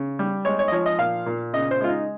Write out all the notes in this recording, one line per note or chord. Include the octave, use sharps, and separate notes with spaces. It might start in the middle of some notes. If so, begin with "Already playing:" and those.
Already playing: C#3
G3
G#3 C#5
C#5
D#5
F3 C#5
D#5
A#2 F5
A#2
C#3 D#5
C5
G#3 F4
D#4